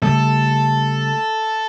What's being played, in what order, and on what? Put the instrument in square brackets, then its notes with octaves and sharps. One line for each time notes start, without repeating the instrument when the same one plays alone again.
[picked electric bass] C#3 G3 A3 [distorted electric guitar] A4